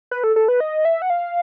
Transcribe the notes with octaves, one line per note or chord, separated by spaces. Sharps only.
B4
A4
A4
B4
D#5
E5
F#5
F5